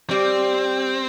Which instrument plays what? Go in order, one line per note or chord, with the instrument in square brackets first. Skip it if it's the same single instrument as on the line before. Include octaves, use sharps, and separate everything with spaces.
[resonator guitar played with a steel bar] G3 [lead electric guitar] C4